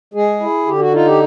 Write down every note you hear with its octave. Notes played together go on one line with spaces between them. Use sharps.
G#3 G#4
E4
D3 G4
F#4
D#4 F4
G4